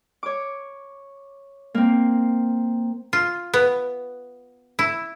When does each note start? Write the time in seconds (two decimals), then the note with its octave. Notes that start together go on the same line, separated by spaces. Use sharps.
0.23 C#5 D6
1.75 A#3 C4
3.13 F4
3.54 B3
4.79 E4